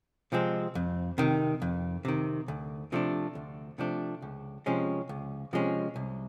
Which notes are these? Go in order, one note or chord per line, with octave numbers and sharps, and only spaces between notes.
C3 F3 G#3 C4
F2
C3 D#3
F2
C3 D#3
D2
C3 F3 A3 D4
D2
C3 F3 A3 D4
C#2
C3 F3 G#3 C#4
C#2
C3 F3 G#3 C#4
C2